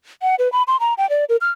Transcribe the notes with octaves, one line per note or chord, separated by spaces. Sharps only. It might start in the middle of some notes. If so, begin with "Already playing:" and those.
F#5
B4
B5
C6
A#5
G5
D5
A#4
F6